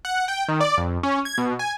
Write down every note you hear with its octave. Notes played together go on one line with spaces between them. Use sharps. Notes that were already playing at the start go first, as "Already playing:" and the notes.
F#5
G5
D#3
D5
F2
C#4
G#6
B2
G#5